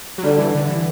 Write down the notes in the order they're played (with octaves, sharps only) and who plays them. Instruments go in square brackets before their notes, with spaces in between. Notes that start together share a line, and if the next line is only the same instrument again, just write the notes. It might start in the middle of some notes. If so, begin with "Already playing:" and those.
[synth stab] F#3
[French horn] D3 [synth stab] G3
[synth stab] E3
D3
E3